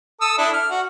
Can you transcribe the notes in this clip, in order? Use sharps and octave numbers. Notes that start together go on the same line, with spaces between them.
A4 D#6 E6
D4 E4 A4
F6
F#4